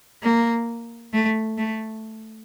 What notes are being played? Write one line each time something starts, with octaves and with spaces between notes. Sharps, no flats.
A#3
A3
A3